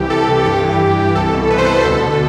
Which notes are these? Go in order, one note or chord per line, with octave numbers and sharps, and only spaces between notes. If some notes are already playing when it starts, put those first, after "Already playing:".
Already playing: C2 E3 G4
C2 A4
C3
G2 G4
E3
G2
E3
C2 A4
B2
C2 B4
C5
B2 B4
D2 A4
D3